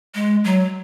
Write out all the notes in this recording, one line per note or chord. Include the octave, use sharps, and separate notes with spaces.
G#3
F#3